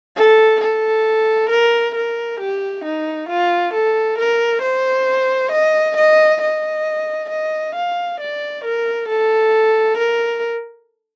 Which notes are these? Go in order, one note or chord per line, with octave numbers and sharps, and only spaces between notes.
A4
A4
A#4
A#4
G4
D#4
F4
A4
A#4
C5
D#5
D#5
D#5
D#5
F5
D5
A#4
A4
A#4